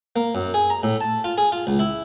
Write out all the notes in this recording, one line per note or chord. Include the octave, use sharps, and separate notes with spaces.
A#3
F#2
G#4
A#5
A2
A5
F4
G#4
F4
C#2
E4